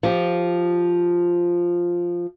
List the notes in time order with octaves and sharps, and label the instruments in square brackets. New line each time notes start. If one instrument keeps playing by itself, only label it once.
[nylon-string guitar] F3 G4